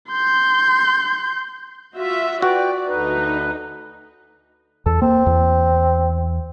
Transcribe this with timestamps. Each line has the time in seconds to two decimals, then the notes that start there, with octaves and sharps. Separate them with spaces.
0.11 C6 G6
1.95 F4 F#4 E5
2.42 F#4 B4 D5 G5
2.88 D2 D#4 B4
4.86 E2 A4
5.02 A#3 C4
5.26 E2